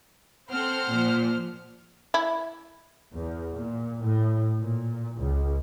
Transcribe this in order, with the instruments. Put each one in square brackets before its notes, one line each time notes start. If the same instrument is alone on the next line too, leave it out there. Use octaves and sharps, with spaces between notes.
[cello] C4 A4 [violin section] C5 F#5 F6
[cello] A#2 F3
[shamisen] E4
[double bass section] E2
A#2
A2
A#2
C#2